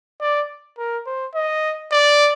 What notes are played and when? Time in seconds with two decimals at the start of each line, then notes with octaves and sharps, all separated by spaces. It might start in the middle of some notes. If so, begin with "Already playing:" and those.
0.21 D5
0.78 A#4
1.06 C5
1.35 D#5
1.92 D5